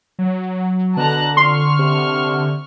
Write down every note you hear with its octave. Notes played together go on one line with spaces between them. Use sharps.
F#3
B2 D3 A5 A#5 F#6
F2 C6 C#6 F6
C3